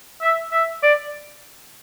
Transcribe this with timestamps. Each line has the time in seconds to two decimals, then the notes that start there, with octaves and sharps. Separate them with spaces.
0.22 E5
0.52 E5
0.83 D5